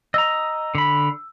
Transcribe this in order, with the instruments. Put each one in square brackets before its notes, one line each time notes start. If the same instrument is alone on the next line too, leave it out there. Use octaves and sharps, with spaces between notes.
[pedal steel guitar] D#5 A#5 [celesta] E6
[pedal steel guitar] D3 B5